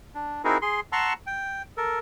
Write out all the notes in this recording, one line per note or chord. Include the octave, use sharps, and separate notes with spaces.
D4
C4 D#4 E4 F#4 G#4 A#4
G#4 C6
F#5 A5 A#5 C6 C#6 E6
G5
A4 A#4